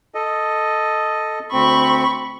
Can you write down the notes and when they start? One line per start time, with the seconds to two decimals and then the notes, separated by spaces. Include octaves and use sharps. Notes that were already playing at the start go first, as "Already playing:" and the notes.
0.15 A4 D#5
1.52 D2 C4 B5 C#6